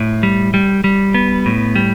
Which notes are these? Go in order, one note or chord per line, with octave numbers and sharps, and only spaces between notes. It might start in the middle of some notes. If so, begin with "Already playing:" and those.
Already playing: A2
G3
G3
G3
B3
A2
G3